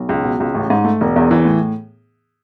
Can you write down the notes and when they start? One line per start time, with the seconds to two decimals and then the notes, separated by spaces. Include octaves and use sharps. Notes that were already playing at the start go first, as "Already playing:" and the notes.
Already playing: B1
0.09 C#2
0.24 B2
0.40 C#2
0.55 A1
0.70 G#2
0.84 A3
1.01 E1
1.16 E2
1.31 E3
1.45 A2